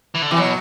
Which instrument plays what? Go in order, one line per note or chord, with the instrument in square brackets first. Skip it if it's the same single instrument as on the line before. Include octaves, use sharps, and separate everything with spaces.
[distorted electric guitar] E3
D3
[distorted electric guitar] C3 [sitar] E3
[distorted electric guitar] B2 [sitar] F#3